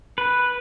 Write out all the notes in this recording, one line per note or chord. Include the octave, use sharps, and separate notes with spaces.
B4